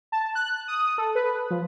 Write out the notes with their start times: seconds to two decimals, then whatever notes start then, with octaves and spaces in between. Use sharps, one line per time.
0.12 A5
0.35 F#6
0.68 D#6
0.98 A4
1.15 B4
1.51 F3